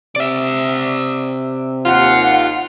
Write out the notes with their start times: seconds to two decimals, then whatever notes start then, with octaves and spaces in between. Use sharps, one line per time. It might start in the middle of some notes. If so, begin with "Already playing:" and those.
0.16 C3 D5 E5
1.86 D#2 F4 F#5